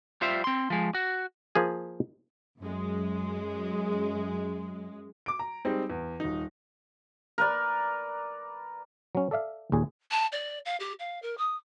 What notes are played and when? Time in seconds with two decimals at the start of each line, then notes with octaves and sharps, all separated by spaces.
0.21 G3 F4 C5 E5
0.44 C4 C6
0.70 F3 G#3
0.95 F#4
1.55 F3 A#3 G#4 G#5
2.60 F#2 G#3
5.26 D6 D7
5.39 A#5
5.65 G3 G#3 C4 D#4
5.90 E2
6.20 D#1 D#4
7.38 A#4 B4 D5
9.15 F#3 C#4
9.31 A4 D5 E5 F5
9.72 D#2 A#2 G#4
10.11 A5
10.32 D5
10.65 F5
10.80 G4
10.99 F5
11.22 A#4
11.38 D#6